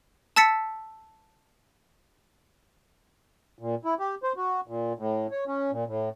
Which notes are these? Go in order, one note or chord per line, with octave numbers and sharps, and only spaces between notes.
A5 E6 A6 B6 C#7
A#2
E4
G4
C5
F#4
A#2
A2
C#5
C#4
A#2
A2